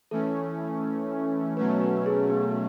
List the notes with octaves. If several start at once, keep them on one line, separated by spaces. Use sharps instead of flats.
E3 A3 C#4 A4
B2 F#3 A3 C#4 B4
B4
G#4
B3